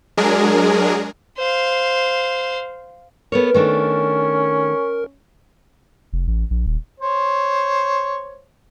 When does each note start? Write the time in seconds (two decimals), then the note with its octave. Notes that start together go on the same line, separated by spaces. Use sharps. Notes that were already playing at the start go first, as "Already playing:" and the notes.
0.17 F#3 G#3 D4 G#4 A#4
1.38 C5 F5
3.32 B3 A4 A#4 C#5
3.54 D#3 A3 C#4 D4
6.13 F1
6.27 A1
6.50 A#1
6.66 D#1
7.00 C5 C#5